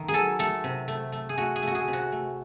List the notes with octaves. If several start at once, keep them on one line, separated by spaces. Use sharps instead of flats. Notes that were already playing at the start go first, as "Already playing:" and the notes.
Already playing: D#3 A3
G#4
F#3 A4
A3 A4
C3
A3
A3
G#4
A3 F#4
G#4
A3
F#4
G#4
C3
F#4
A3